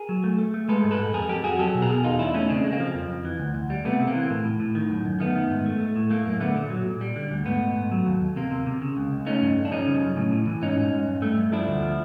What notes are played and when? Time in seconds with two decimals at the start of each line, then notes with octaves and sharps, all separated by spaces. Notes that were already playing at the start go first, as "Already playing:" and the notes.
Already playing: G#4 A#4
0.09 F#3
0.24 A3
0.39 A3
0.54 A3
0.68 G#3 A4 B4
0.84 G#2
0.91 A4 B4
0.98 G#2
1.14 F2 G#4 A#4
1.29 F2 G4 A4
1.44 F2 F#4 G#4
1.59 F#3 G4 A4
1.75 B2
1.82 G#4 A#4
1.89 B2
2.04 E2 D#4 F4
2.19 E2 D4 E4
2.34 A3 C#4 D#4
2.49 C#3 C4 D4
2.64 G#3
2.72 A#3 C4
2.80 F3
2.94 F2
3.10 F2
3.25 E3
3.40 D2
3.55 D2
3.70 G3
3.85 C3 A3 B3
4.00 C3
4.07 A#3 C4
4.15 E3
4.30 A2
4.45 A2
4.60 A2
4.75 D#3
4.90 F#2
5.05 F#2
5.20 D#3 A3 B3
5.36 D#3
5.50 G#2
5.66 A3
5.80 A3
5.96 A2
6.10 A3 A#3
6.25 F#2 A#3
6.40 D3 A3 B3
6.56 A#2
6.70 F#3
6.86 A#2
7.01 G3
7.16 D3
7.31 D2
7.46 G#2 A3 B3
7.61 G#2
7.76 G#2
7.91 F#3
8.06 D#2
8.21 D#2
8.36 C3 A#3
8.51 C3
8.66 C3
8.82 C#3
8.97 C#2
9.12 C#2
9.26 A3 C#4 D#4
9.42 G2
9.57 G2
9.65 D4
9.71 F3 C#4 D#4
9.87 C#3
10.02 F#2
10.17 A2
10.32 A2
10.47 E3
10.62 G#2 C#4 D#4
10.77 G#2
10.92 G#2
11.07 G2
11.22 A3
11.37 G2
11.52 F3 D4 E4
11.67 D2
11.83 F3